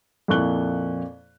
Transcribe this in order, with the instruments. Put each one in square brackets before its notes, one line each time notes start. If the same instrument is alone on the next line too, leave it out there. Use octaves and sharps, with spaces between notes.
[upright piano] F2 A#2 E4 C#6 F#6 G7